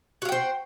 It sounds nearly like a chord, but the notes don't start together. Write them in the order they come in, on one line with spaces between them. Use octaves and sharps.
F#4 F5 G5 C5